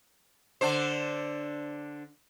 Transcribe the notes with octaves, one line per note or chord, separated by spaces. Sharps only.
D3 D4 C5